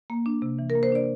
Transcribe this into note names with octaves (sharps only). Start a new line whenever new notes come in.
A#3
D4
C3
E3
A#4
A#3
C5
D4 D5